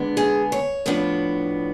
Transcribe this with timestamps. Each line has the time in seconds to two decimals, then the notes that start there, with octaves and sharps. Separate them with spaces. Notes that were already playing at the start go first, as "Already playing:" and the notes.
Already playing: D3 G#3 B3 D4
0.17 G#4
0.52 C#5
0.86 A2 F3 B3 D4